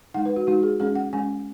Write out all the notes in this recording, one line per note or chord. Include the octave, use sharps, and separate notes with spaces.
G#3 D#4 F#5
B4
F#4
G#3 D#4 F#4
G#4
G#3 C#4 G#4
F#5
G#3 C#4 G#5